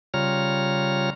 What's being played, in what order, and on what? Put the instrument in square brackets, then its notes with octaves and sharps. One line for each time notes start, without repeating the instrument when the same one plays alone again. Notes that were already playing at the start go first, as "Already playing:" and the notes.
[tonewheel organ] C#3 G3 F4 C#5 A#5 F6